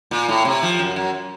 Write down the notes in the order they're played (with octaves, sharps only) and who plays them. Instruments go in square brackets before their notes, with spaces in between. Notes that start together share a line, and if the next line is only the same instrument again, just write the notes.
[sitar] A#2
A2
C3
F3
F#2
F#2